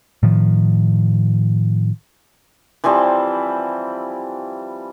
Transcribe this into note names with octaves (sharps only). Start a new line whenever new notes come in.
A2 D#3 F3
E3 F3 G3 C4